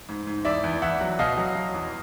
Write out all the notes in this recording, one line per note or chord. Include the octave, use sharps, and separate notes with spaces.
G#2
G#2
E2 D5 E5
E2
E2 E5 F#5
F#3
B2 D#5 F5
F#3
F#3
E2